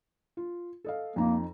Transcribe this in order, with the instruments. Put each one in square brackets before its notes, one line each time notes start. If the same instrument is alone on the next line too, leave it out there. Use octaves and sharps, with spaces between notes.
[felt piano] F4
A4 D#5 F5
[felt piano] F2 D#4 A#5 [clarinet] A#3